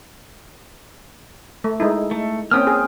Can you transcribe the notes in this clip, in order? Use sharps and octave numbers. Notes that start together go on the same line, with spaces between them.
A3
G#3 D#4 E4
A3
A#3 C4 C#4 G5 D#6 F6
G#4